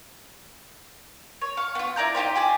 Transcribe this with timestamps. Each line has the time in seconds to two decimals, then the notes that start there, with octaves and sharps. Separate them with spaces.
1.41 C#5
1.57 F5 C#6
1.75 B3 F4
1.96 E4 D5 A#5 G6
2.15 D#4 F4 G4 C5
2.35 G4 G#4 D5